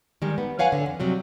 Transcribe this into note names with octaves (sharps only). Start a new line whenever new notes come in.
D#3 G3 G#3
B3
B4 C#5 F5 F#5 G#5
D3
F2
C3 F#3 G3